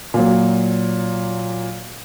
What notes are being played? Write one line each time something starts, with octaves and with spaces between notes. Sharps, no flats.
A#2 F#3